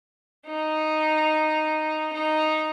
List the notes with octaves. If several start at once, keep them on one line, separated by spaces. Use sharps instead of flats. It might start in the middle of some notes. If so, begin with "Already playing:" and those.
D#4
D#4